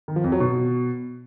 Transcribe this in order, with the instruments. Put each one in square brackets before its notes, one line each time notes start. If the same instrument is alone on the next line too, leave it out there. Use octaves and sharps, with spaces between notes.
[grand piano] D#3
F3
F2
F#3
B2